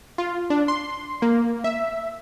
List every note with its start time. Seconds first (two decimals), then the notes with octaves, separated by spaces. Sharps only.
0.18 F4
0.50 D4
0.68 C6
1.22 A#3
1.64 E5